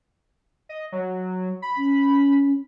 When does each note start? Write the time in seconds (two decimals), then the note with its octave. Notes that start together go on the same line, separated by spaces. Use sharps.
0.69 D#5
0.92 F#3
1.62 B5
1.77 C#4